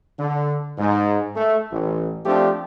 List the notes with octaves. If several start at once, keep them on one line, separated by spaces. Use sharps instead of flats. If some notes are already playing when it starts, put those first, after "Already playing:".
D3
G#2
A3
A1
F3 A3 C4 D4 G4